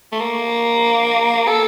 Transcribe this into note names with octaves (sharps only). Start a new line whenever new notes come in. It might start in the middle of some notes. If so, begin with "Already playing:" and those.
A3
A#3
A4